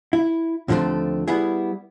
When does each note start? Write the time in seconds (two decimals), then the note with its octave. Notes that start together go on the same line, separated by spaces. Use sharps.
0.13 E4
0.68 D#2 D3 F3 G3 A3 C4
1.28 G3 B3 E4 G#4